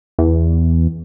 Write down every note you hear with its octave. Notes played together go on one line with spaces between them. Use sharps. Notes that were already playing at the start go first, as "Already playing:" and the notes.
E2